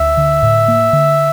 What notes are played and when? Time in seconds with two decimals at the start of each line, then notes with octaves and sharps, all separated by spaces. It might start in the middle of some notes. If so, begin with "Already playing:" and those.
Already playing: D2 E5
0.17 D3
0.43 A2
0.68 A#3
0.93 D3